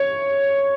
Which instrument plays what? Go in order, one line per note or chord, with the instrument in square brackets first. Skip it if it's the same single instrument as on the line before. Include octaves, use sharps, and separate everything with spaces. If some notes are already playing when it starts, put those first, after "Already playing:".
Already playing: [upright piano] C#5